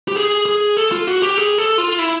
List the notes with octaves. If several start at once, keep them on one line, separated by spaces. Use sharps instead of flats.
G4
G#4
G#4
A4
F4
F#4
G4
G#4
A4
F4
E4